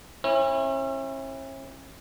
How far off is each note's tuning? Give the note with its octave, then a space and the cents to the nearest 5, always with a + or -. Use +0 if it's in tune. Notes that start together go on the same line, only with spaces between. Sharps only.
C#4 -40 E4 +0